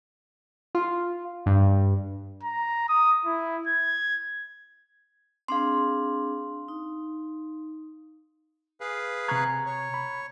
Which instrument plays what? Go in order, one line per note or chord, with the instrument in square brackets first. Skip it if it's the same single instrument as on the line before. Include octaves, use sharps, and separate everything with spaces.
[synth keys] F4
G2
[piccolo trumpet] A#5
D#6
E4
G#6
[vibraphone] C4 D4 G#4 [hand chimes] F5 C6
[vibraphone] D#4
[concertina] G#4 B4 F5
[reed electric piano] C3 G#6 [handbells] A#5 C#6 F#6
[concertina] C#5
[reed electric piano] B5